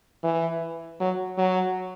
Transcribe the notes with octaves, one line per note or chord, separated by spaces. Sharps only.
E3
F#3
F#3